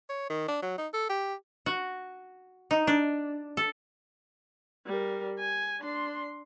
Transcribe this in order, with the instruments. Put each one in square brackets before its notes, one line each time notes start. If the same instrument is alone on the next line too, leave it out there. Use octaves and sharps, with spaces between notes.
[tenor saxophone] C#5
D#3
D4
F#3
D#4
A4
G4
[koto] F#4
D#4
D4
A4
[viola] G3 A#4
G#5
D4 C6